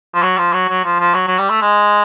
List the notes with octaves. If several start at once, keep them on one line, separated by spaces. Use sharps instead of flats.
F3
F#3
F3
F#3
F#3
F3
F3
F#3
F#3
G3
A3
G#3